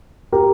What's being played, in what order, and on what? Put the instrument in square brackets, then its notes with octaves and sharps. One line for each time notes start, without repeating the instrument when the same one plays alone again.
[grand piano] G4 A#4